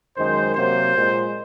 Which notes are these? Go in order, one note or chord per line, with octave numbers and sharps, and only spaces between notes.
F#2 D#3 G#3 C5
C3 F#3 A#3 C5
A#2 G#3